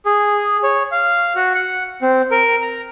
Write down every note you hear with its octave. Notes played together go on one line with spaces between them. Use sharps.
G#4
C#5
F5
F#4
F#5
C4
A#4
A#5